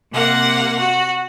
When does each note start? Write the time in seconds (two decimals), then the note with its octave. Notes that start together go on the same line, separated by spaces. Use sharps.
0.13 C3 A#3 F#5
0.79 F#4